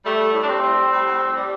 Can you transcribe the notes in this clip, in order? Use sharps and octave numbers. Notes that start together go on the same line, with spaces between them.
G3 A3
G3
A2
D4
A2 G3 C4
G3
G3
A2
A2
G3
G3